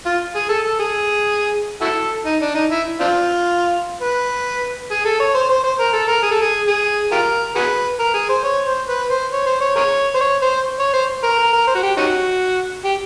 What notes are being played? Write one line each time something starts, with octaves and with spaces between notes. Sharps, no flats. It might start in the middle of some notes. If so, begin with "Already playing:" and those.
F4
G#4
A4
A4
G#4
E4 F#4 A4
D#4
D4
D#4
E4
C4 D4 F4
B4
G#4
A4
C#5
C5
C5
C5
A#4
A4
A#4
G#4
A4
G#4
G#4
F4 G4 A#4
F#4 G#4 B4
A#4
G#4
C5
C#5
C5
B4
C5
C#5
C5
C#5
G#4 A#4 C#5
C5
C#5
C5
C#5
C5
A#4
A#4
A#4
C5
F#4
G4
C#4 D#4 F#4
G4